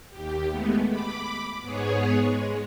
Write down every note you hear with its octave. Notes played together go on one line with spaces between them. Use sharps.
D#2 G4
G#3 A3 B3
B5 D6
G#2 B3 G#4 C#5
G#3